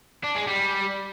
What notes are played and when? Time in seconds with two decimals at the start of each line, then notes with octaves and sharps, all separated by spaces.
0.24 D4
0.35 G#3
0.47 G3